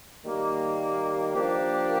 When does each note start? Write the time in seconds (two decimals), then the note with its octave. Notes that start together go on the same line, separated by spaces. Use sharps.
0.23 D#3 G3 A#3
1.34 F3 A#3 D4 G4